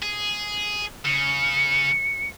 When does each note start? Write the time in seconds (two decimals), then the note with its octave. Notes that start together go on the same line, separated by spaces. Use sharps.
0.02 G#4
1.05 C#3 C#7